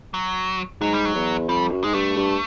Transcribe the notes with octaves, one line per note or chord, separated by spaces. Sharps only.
F#3
G#2 F#3
G3
F#3
E2
F2 G3
F#2
G#2 G#3
G2 A3
G2